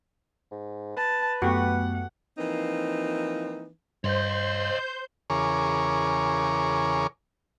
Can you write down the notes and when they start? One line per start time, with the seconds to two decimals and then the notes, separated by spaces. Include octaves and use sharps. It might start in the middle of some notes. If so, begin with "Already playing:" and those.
0.52 G#2
0.97 B4 A5
1.42 F#2 A3 B3 F#4 G4 F#5
2.38 E3 F3 A#3 C4 D#4
4.04 G2 C5 C#5 D#5 G6
5.30 E2 C#3 G#4 A#4 C#5 D6